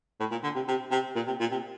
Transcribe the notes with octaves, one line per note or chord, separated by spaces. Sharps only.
A2
A#2
D3
C3
C3
C3
A#2
C3
A#2
C3